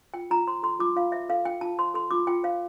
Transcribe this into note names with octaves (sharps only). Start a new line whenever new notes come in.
F4 G5
F4 A#5
C5 C6
A4 C6
F4 D6
F4 F5
C5 E5
A4 F5
F4 G5
F4 A5
C5 C6
A4 C6
F4 D6
F4 G5
C5 F5